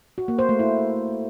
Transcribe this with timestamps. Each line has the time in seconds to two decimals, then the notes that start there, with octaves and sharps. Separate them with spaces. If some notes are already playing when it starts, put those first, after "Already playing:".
0.18 F#4
0.28 A#3
0.39 C5
0.49 A3
0.59 E4